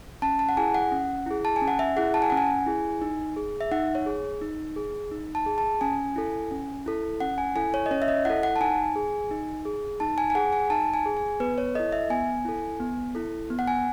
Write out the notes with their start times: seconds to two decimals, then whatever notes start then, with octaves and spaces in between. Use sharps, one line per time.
0.22 C#4 A5
0.39 A5
0.49 F#5
0.57 E4 G#4 G#5
0.74 F#5
0.92 C#4
1.26 E4 G#4
1.45 A5
1.56 G#5
1.61 C#4
1.68 F#5
1.79 E5
1.96 E4 G#4 F#5
2.14 A5
2.22 G#5
2.30 C#4 F#5
2.37 G#5
2.66 E4 G#4
3.02 D#4
3.36 G#4
3.61 E5
3.71 D#4 F#5
3.95 C#5
4.06 G#4
4.41 D#4
4.76 G#4
5.11 D#4
5.35 A5
5.46 G#4
5.58 A5
5.81 C#4 G#5
6.16 E4 A4
6.51 C#4
6.86 E4 A4
7.20 C#4 F#5
7.38 G#5
7.56 E4 A4 G#5
7.74 C#5
7.86 D#5
7.91 C#4 C#5
8.02 E5
8.08 D#5
8.25 E4 A4 F#5
8.43 F#5
8.56 A5
8.60 D#4 G#5
8.96 G#4
9.31 D#4
9.65 G#4
10.00 D#4 A5
10.18 G#5
10.30 G#5
10.35 G#4 F#5
10.53 G#5
10.70 D#4 A5
10.94 G#5
11.06 G#4
11.17 G#5
11.40 B3 B4
11.58 C#5
11.75 E4 A4 D#5
11.92 E5
12.10 B3 G#5
12.45 E4 A4
12.80 B3
13.15 E4 A4
13.50 B3
13.59 F#5
13.67 G#5